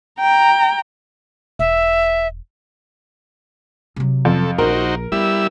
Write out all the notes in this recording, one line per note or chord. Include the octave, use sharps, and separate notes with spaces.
G5 A#5
E1 E5
C3 F#3
F2 A4
A#1 D#4 F#4 A#4 C5
G3 B3 E4 E6